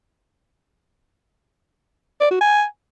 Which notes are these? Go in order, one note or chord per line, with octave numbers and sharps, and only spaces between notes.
D5
F#4
G#5